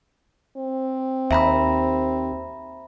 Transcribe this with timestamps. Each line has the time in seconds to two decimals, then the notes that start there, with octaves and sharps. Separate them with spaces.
0.57 C4
1.31 D#2 E5 A#5 B5